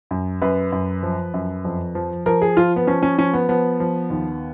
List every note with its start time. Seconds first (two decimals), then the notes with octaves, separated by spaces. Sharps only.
0.11 F#2
0.42 F#2 B4
0.72 F#2
1.03 F3
1.34 F#2
1.65 F2
1.95 F3
2.26 F3 A#4
2.42 G#4
2.57 F3 F4
2.76 B3
2.87 F3 C#4
3.03 C#4
3.18 F3 C#4
3.33 B3
3.49 F3 B3
3.80 F3
4.10 D#2